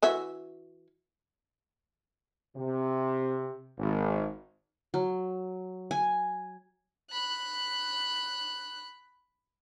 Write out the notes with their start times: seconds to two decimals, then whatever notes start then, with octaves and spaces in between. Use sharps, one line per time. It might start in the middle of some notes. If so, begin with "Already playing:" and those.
0.02 E3 F#4 E5
2.56 C3
3.77 G#1
4.94 F#3
5.91 G#5
7.10 B5 F#6